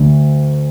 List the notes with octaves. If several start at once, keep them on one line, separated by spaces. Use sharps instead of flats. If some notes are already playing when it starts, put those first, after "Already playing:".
Already playing: D2 D3